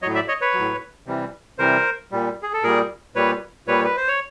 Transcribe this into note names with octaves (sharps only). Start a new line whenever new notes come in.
A2 F#3 C#5 D#5
D5 E5
C#5 D#5
B4 C#5
F#3
A2
C3 E3 G3
C3 E3 G3 A#4 C5
A#2 G3
G#4
A4
A#2 G3 G#4 A#4
A#2 G3 B4 C#5
A#2 G3 B4 C#5
B4
C5
C#5